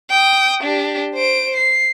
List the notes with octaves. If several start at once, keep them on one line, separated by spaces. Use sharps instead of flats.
G5 D#6
D4 G4
C5 D7
C7